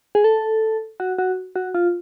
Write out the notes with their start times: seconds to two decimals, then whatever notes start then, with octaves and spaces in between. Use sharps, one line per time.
0.15 G#4
0.24 A4
1.00 F#4
1.18 F#4
1.55 F#4
1.74 F4